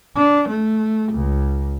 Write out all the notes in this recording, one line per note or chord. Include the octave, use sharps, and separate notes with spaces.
D4
A3
C#2